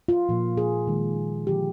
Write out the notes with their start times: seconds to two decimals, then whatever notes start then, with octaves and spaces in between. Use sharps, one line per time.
0.08 F4
0.29 A#2 F3 A#3
0.57 G#4
0.87 D#3 G#3
1.47 D3 F3 A#3 G4